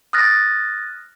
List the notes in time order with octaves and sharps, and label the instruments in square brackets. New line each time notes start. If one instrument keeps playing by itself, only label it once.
[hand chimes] D#6 F6 F#6 A6 A#6